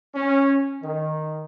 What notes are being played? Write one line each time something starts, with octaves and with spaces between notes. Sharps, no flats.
C#4
D#3